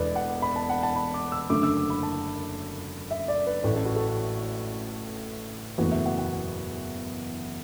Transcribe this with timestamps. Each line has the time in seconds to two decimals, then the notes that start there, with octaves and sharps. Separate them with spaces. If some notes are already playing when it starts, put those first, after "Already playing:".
Already playing: E1 E2 E3 A4 B4 D5
0.15 F#5
0.42 B5
0.56 A5
0.69 F#5
0.83 A5
0.96 B5
1.14 D6
1.32 E6
1.50 F#1 F#2 D3 A3 D6
1.63 E6
1.77 D6
1.90 B5
2.03 A5
3.11 E5
3.28 D5
3.47 B4
3.63 A1 A2 A3 B4
3.75 A4
3.85 F#4
3.96 A4
5.78 F#1 E2 E3 A3 F#4
5.91 E5
6.05 F#5
6.18 F#5